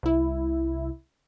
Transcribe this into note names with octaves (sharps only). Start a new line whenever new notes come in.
C2 E4